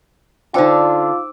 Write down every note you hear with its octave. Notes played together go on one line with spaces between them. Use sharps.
D3 D4 D#4 F4 C5 G5 D6 E6